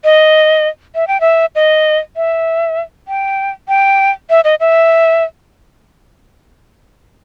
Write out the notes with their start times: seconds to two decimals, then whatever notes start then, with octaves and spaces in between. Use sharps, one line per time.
0.04 D#5
0.95 E5
1.08 G5
1.21 E5
1.55 D#5
2.16 E5
3.08 G5
3.68 G5
4.30 E5
4.44 D#5
4.60 E5